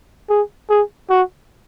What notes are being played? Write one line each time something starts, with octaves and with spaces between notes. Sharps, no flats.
G#4
G#4
F#4